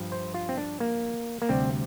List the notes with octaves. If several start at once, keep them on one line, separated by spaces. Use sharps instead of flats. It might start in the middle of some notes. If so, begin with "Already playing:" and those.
Already playing: G2 F3
C5
F4
C4
D4
A#3
A#3
D2 C3 G3 C4